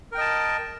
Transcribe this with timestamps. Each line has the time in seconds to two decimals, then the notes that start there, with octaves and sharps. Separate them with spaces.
0.12 A#4
0.15 G5
0.18 D#5
0.21 A5